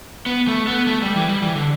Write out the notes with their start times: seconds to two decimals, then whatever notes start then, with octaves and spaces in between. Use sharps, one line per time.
0.26 B3
0.48 A3
0.67 B3
0.87 A3
1.02 G3
1.15 E3
1.29 G3
1.42 E3
1.55 D3